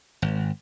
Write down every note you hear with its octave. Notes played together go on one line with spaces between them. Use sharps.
G#1